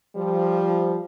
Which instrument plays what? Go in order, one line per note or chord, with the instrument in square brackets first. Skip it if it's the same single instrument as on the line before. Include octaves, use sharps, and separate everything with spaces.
[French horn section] F3 [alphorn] G3